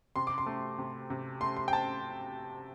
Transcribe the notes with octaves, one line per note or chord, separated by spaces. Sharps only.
C3 C6
D6
C6
A3
C3
C3
A3 C6
C6
G5
C4 A5